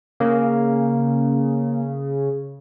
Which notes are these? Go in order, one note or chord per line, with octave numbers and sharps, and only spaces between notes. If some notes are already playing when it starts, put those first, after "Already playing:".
C#3 A#3